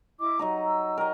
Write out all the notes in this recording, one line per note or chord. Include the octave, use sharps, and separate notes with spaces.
E4 D#5 D6
F#3 D#4 D#5 A#5
E6
A#4 D#5 G5